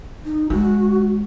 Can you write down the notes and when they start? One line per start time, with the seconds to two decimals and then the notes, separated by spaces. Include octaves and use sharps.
0.25 D#4
0.50 G#3 F#4